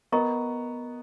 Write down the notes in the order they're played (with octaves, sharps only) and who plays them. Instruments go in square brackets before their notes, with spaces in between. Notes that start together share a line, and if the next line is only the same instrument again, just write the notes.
[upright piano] B3 [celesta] A#4 D#5 A#5 C#6